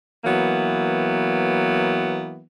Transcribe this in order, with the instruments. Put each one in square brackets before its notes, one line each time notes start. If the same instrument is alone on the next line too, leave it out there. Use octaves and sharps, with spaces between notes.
[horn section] E3 F#3 A#3 B3